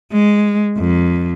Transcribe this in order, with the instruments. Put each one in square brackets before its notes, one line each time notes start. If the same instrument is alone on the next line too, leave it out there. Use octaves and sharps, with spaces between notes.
[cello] G#3
F2